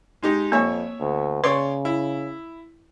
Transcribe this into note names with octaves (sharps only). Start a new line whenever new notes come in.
G#3 D#4 G4
F2 A#3 C#5 E5
D2
C#3 B4 C#5 D5 C6
E4